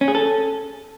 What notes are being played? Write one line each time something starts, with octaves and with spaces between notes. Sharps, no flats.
C#4
G#4
A4